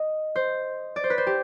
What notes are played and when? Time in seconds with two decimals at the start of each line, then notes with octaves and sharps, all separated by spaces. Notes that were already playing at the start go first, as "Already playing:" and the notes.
Already playing: D#5
0.36 C5
0.96 D5
1.04 C5
1.10 B4
1.18 C5
1.27 G4